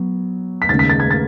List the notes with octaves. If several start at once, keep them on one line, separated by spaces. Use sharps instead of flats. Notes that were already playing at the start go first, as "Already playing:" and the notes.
Already playing: F#3 B3
B6
D#2 C#3 G#3 A6
B6
A6
G#6
A6